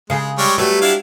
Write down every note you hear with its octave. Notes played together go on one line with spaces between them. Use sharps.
C#3 G#3 G#4
G3 G#3 C#5
F#3 G3 A3 B4
D4 E4 F5